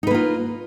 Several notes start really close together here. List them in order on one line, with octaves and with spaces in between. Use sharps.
D#4 B4 A#3 F4